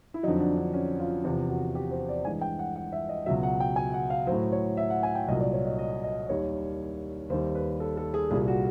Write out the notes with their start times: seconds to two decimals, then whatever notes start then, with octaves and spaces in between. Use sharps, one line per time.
0.14 E4
0.23 F2 D3 F#3 D#4
0.40 D4
0.57 D4
0.74 C#4
0.99 F4
1.24 E2 C3 F3 F4
1.49 F#4
1.75 G4
1.91 C5
2.09 D5
2.25 G2 E3 G#3 G#5
2.41 G5
2.59 F#5
2.75 F#5
2.92 E5
3.09 D#5
3.26 C#2 B2 F#3 E5
3.43 F#5
3.60 G5
3.76 G#5
3.94 F#5
4.10 F5
4.27 F#3 C5
4.32 A2
4.52 C#5
4.77 E5
4.90 F#5
5.03 G#5
5.15 G5
5.28 C2 A#2 F#3 D#5
5.40 D5
5.53 C#5
5.66 D#5
5.79 D#5
6.04 D#5
6.29 D#2 D#3 G3 C#5
7.30 D#2 D#3 G3 C5
7.55 B4
7.80 A4
7.97 A4
8.14 G#4
8.31 C2 A#2 G3 G#4
8.48 F#4